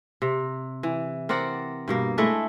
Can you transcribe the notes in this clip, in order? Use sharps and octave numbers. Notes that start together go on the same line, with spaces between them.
C3
E3
C4 A#4 D5 F#5
G2 B2 A#3
G#3 A3 E4